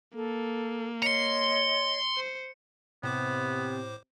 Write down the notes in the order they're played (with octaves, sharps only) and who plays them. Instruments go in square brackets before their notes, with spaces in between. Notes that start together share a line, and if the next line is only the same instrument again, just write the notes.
[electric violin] A#3 [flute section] A4
[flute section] C#5 D#5 [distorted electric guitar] A#5 C6 [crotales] C#7
[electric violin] C5
[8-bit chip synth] A2 C5 D6 [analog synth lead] C3 [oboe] B3